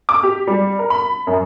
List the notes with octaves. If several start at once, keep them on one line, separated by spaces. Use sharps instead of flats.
D6
G4
G3
A#4
B5
F#2